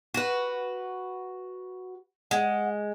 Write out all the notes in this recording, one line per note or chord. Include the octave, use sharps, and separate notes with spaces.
F#4 B4
G#3 F#5